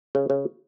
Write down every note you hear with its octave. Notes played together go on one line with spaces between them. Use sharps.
C#3
C#3